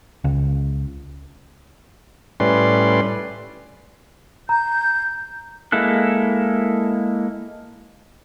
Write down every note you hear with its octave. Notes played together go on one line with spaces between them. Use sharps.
C#2
A2 G3 C#4 B4 D5 C6
A#5 G6
G#3 A#3 E4 A4 F#6